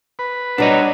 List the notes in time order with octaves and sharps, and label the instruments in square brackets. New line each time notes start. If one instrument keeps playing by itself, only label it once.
[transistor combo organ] B4
[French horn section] F#3 [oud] G3 B3 [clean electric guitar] D4 D#5